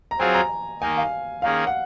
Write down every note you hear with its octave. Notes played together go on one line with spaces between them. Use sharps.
A#5
F#3 C4 F4 G#4 G#5
A#5
D#3 A#3 D#4 G#5
F5
D#3 A#3 C#4 G#4 F5
F#5